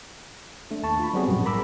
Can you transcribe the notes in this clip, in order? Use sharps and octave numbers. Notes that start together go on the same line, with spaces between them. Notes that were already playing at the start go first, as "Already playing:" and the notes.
A3 D4
D#2 A5 C#6
F4 B5
F#3 G3 B3 C4 F#4 G#4
A#1 F#2 A2
G#4 A#4 A#5 B5 D6 E6